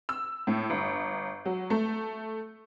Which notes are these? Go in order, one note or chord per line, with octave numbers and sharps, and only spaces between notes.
E6
A2
G1
F#3
A3